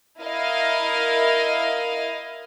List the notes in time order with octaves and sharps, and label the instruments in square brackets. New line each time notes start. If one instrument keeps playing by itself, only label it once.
[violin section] E4 A#4 D#5 F5